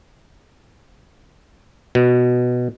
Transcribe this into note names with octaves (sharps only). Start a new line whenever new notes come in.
B2